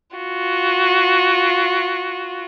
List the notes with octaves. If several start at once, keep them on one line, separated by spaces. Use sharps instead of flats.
F4 F#4